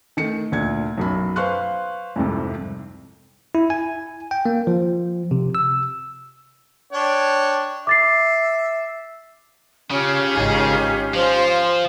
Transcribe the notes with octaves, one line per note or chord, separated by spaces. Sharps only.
D#3 A3 C#7
D2 A#2 G#6
B1 F#2 B5
B4 C5 F5 C6 C#6 F#6
C2 F2 G#2 C3
E4
G#5
G5
A#3
F3
C3
E6
D4 C#5 G5
E5 D6 A6 C7
C#3 C#4 F4 G4
G#1 D#4 G#4
F3 C5 F5 G#5